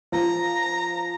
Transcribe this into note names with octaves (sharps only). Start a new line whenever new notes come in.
F3 A#5